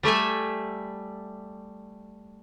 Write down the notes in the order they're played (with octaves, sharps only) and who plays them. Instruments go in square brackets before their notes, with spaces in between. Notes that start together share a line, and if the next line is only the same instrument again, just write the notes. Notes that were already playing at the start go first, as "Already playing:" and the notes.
[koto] G3 A3 E5 G#5